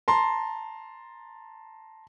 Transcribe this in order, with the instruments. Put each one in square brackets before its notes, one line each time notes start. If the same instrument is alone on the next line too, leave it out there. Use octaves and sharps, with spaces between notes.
[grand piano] A5 A#5 C6